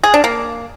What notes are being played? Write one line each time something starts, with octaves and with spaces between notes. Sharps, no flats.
G#4
D4
A#3